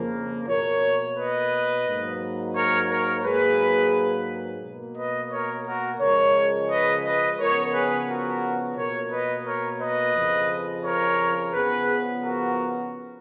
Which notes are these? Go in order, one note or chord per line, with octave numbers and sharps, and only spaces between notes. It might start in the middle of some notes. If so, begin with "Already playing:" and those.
Already playing: F2 C#3 F3 A#3
B2 A#3 A#4 C#5
B4 D#5
G#2 F#3 A#3
A#4 C#5
A#4 C#5
G#2 F#3 A#3 G#4 B4
B2 A#3
B4 D#5
A#4 C#5
F#4 A#4
C#3 F3 G#3 A#4 C#5
B4 D#5
B4 D#5
C#3 F3 B3 A#4 C#5
G#4 B4
F#4 A#4
B2 A#3 A#4 C#5
B4 D#5
A#4 C#5
B4 D#5
F2 C#3 F3
A#4 C#5
C#3 F3 B3 G#4 B4
F#4 A#4